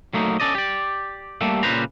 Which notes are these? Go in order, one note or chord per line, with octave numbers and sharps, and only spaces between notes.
F#3 A3 A#3 D#4
C#4 A4 D5 D#5
G4 D5
G3 A3 A#3 G4 A4
A#2 C#3 G3 B4 C5 A#5